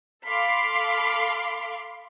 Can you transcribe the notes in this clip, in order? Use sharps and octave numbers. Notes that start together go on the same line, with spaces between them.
A4 F5 B5 C6 D6